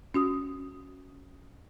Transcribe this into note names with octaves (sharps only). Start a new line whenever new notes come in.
C#4 F#4 D#6